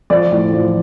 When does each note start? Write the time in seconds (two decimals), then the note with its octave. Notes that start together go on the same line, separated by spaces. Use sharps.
0.10 F3 D5
0.32 A2
0.53 F3